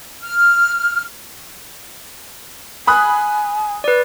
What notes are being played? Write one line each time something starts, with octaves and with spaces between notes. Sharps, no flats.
F6
G#5 B5 D#6 F#6
B4 D5